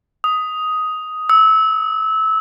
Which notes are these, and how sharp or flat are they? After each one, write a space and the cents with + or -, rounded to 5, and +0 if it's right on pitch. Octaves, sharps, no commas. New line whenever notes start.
D#6 +10
E6 -25